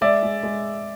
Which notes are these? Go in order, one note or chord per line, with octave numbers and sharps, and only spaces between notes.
G#3 D5 E5
G#3
G#3